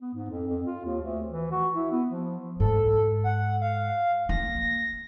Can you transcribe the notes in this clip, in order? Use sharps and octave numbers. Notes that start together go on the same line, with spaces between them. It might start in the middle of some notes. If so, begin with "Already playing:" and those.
B3
G#2
F2
F2
F4
D#2
D2
E3
F#4
E4
B3
F3
G#2 A4
F#5
F5
A#3 A#6